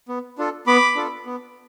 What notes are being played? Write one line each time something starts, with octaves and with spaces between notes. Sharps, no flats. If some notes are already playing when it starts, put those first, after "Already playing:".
B3
D4 F4 A4
B3 B5 D6
D4 F4 A4
B3